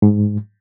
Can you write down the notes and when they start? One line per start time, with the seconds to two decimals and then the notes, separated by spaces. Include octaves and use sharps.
0.02 G#2